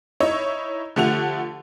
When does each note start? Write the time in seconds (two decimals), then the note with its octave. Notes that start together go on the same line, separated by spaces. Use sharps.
0.20 D#4 E4 C#5
0.96 D3 F3 A3 G4 F#5 F7